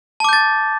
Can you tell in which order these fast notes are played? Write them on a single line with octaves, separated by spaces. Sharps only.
A5 D6 G6 A6